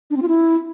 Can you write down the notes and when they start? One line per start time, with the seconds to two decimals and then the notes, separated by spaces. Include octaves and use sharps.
0.10 D4
0.16 C4
0.22 F4
0.28 E4